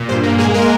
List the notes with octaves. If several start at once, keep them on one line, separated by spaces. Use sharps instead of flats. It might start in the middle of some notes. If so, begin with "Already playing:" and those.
Already playing: A#2
G2 C5
A#3
G#3 G#4
G#3 A#4